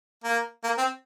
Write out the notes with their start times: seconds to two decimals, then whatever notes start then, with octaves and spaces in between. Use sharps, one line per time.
0.24 A#3
0.64 A#3
0.78 C4